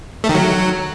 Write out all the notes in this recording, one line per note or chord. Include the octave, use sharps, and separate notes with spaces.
A3
D#3
F#3